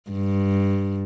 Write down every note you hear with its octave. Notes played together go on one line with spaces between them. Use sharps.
G2